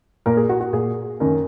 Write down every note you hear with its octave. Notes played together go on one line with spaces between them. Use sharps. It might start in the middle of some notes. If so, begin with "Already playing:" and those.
A#2 A#4
G#4
F#4
F#4
A#2 G#4
F#2 D#3 A#4